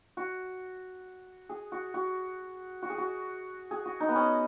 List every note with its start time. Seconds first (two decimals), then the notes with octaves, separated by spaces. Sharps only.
0.17 F#4
1.49 G#4
1.72 F#4
1.94 F#4
2.82 F#4
2.90 G#4
2.98 F#4
3.71 G#4
3.85 F#4
4.00 D#4
4.08 B3
4.15 C#4